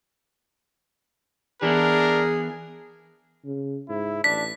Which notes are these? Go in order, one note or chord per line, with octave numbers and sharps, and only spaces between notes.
E3 B3 D4 G#4 A#4
C#3
G#2 E4
A1 D4 B6